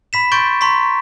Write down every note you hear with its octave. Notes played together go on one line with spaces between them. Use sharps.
B5 B6 E7
C6 C#6 G6 A6 D7
A#5 C6 C#6 B6